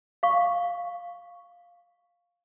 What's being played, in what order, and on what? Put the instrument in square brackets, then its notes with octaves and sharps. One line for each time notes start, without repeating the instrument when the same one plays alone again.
[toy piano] F5 C#6